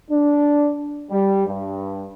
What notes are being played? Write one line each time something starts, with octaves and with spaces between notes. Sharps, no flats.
D4
G3
G2